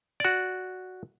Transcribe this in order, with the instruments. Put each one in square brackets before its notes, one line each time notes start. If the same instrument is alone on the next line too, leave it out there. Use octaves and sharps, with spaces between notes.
[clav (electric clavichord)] F#4 D5